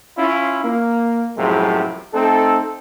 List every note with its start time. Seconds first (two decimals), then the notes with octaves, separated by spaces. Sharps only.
0.18 C#4 E4 F4
0.64 A#3
1.37 F#2 A2 C3 F3 F#3 G#3
2.14 A3 C4 D#4 A4